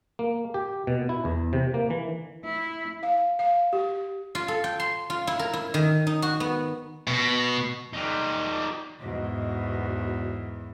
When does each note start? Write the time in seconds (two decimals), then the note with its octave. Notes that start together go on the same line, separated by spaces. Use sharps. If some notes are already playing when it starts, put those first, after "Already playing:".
0.19 A#3
0.54 G4
0.87 B2
1.09 E4
1.25 E2
1.53 C3
1.74 A#3
1.90 E3
2.45 E4
3.03 F5
3.39 F5
3.73 G4
4.35 F4
4.48 A4
4.64 G5
4.80 C6
5.10 F4
5.27 E4
5.39 A#4
5.53 E4
5.74 D#3
6.07 D#4
6.22 F#4
6.40 B3
7.08 B2
7.93 G3 D#4
9.00 E2 G#2 B2